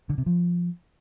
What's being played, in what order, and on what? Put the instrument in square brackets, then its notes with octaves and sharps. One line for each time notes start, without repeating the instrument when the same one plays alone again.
[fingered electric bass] D3
C3
F3